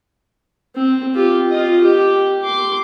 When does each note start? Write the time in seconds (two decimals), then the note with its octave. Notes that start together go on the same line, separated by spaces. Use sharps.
0.75 C4
1.15 F4 G4
1.50 F4 D#5
1.81 G4
2.43 C6 D6